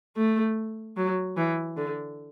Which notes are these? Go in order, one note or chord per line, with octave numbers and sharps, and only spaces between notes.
A3
F#3
E3
D3